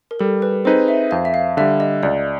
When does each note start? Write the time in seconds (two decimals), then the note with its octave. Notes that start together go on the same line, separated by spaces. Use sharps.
0.11 A#4
0.20 G3 A4
0.42 B4
0.65 C4 D#4 G#4 B4 C5
0.88 E5
1.11 F2 F5
1.25 E5
1.34 F5
1.57 D3 G3 E5
1.80 D#5
2.03 C#2 D5